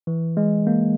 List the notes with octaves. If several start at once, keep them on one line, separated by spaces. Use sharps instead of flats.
E3
G#3
A#3